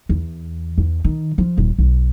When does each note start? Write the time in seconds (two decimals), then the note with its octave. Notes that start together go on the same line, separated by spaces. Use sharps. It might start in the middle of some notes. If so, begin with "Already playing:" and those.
0.09 E2
0.78 E2
1.04 D#3
1.38 F3
1.58 D#1
1.78 B1